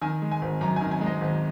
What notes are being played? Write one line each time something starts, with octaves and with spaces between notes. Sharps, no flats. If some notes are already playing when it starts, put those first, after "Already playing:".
D#3 G#5
G#3
G#5
G#1
F#2 A#5
D#3 G#5
G#5
G#3
D#5
G#1